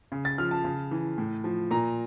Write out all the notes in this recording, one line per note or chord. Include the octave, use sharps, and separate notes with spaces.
C#3
A6
F3 F6
A5
C#3
E3
A2
F3
A#2 A#5